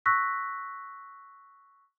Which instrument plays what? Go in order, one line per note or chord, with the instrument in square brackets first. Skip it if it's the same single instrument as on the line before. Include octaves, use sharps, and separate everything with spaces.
[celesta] C#6 E6 F#6 A#6 B6